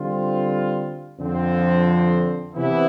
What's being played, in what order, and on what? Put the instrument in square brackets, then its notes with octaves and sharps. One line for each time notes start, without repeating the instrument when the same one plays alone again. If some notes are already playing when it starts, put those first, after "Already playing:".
Already playing: [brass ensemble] D3 G3 C4 F4
F2 D3 F3 C4
C3 E3 B3 E4